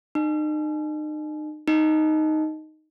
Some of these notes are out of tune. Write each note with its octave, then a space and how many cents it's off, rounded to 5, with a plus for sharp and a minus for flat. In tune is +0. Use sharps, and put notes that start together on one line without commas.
D#4 -35
D#4 +0